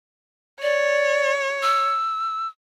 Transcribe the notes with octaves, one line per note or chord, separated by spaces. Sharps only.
C#5 D5
E6